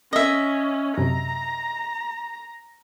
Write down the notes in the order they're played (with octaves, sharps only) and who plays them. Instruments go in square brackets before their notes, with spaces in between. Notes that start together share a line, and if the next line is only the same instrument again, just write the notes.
[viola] C#4 [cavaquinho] D#5 E5
[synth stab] F#2 C3 [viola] A#5